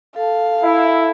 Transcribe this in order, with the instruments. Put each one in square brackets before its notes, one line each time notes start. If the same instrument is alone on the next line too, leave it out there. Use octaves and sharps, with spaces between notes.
[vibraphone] A4 A5 [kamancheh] F5
[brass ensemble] E4